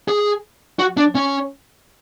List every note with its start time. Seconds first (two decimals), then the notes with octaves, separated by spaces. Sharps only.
0.08 G#4
0.79 F#4
0.97 D4
1.15 C#4